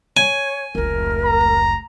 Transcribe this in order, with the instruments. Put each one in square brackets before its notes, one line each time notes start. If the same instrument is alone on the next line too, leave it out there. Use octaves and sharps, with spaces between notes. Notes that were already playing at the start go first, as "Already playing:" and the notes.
[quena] C#5 [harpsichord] G#5
[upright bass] F1 C#2 [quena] A#4
[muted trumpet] A#5